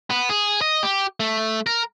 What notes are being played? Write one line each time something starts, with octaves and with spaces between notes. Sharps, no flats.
B3
G#4
D#5
G4
A3
A#4